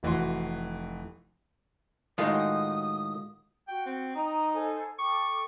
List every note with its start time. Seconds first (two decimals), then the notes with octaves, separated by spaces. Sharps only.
0.03 F1 E3 F#4 C6
2.18 A2 D#3 G#3 F4 F#4 D#6
3.68 F#4 G5
3.86 C4
4.16 D#4 G5 A#5 D#6
4.54 A4 C5 G#5
4.99 A4 G5 C#6 D6